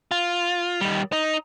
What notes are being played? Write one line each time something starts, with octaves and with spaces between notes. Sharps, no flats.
F4
D#3 G3
D#4